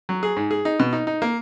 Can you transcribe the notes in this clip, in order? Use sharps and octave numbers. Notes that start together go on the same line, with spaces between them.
F#3
G#4
G#2
G#4
D#4
B2
D#4
D#4
A#3